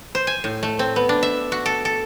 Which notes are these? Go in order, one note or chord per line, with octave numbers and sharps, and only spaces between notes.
C5
G#5
A2
A3
C4
B3
D4
E5
F#4
A4
A4